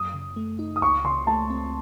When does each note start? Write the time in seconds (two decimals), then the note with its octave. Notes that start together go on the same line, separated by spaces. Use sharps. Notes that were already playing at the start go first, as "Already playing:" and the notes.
Already playing: F#2 D#6
0.14 C#3
0.36 A3
0.59 D#4
0.76 D#6
0.82 C#2 C#6
1.04 C#3 C6
1.27 A3 A5
1.50 C4